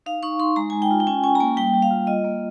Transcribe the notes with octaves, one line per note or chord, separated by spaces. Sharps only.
D#4 F5
D#4 C#6
D#4 C6
G#3 A#5
G#3 G#5
G5
F4
G5
C#4 G#5
C#4 G#5
A#5
A#3 G#5
G3 G5
G3
F5
F4
F4 D#5
A#3